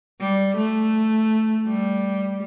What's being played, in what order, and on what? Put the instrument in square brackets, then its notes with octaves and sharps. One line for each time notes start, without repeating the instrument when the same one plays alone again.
[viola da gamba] G3
A3
G3